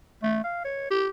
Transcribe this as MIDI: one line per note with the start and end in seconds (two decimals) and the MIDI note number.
0.22 0.40 57
0.43 0.61 77
0.64 0.85 73
0.90 1.08 67